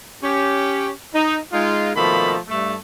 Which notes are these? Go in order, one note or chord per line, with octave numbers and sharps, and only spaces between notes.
C#4 G4
D#4
G#3 D#4 F4
B2 D#3 F3 A3 A#3 B5
G2 A3